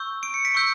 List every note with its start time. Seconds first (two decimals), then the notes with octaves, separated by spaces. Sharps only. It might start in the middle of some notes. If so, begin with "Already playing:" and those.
Already playing: C#6 E6 G6
0.23 D7
0.34 C#7
0.45 B6 D7
0.55 C#6 E6 G6